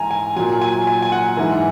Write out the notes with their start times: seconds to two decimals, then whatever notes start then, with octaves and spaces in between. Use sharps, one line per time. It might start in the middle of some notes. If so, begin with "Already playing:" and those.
Already playing: G#2 E3 G#5 A#5
0.11 G#5
0.36 A#2 F#3 G#5
0.61 G#5
0.87 G#5
1.02 G#5
1.12 F#5
1.37 G#2 E3